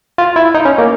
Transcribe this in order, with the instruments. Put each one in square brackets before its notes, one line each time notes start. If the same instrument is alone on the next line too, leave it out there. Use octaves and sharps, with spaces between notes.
[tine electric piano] F4
E4
D#4
C#4
A#3